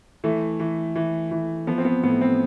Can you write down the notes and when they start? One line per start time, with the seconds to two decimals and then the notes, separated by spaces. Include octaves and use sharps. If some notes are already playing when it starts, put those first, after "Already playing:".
0.24 E3 A3
0.60 E3
0.96 E3
1.31 E3
1.67 F3 B3
1.78 C4
1.85 B3
2.03 A2 B3
2.21 C4